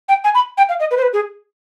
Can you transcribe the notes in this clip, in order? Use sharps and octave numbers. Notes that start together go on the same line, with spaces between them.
G5
G#5
B5
G5
F5
D#5
B4
C5
B4
G#4